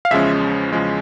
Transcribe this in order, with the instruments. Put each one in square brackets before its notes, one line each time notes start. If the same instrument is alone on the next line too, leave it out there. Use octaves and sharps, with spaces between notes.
[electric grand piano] F5
E2 C#3 F3 G#3 C#4 E5
E2 C#3 F3 G#3 C#4